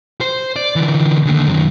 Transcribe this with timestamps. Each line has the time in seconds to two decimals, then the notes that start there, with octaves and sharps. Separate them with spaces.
0.21 C5
0.56 D5
0.76 D3 E3
1.25 D#2 D3
1.47 F#2 D#3